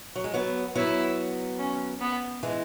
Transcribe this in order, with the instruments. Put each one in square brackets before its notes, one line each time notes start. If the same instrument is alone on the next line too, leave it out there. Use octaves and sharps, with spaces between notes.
[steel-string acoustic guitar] F#3
G#3
F#3 B3
[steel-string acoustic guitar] F#3 B3 [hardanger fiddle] E4
[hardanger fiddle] C#4
B3
[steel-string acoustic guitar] E3 G#3